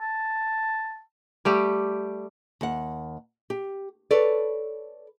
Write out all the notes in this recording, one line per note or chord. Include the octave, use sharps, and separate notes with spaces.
A5
G3 A3 G4
D#2 F#5
G4
A4 B4 C#5 D5